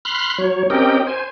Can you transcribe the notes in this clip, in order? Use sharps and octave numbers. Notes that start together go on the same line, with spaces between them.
B5 C6 F6 F#6
F#3 C#5
C4 C#4 G4 A#4 D#5 G5
C5 G#5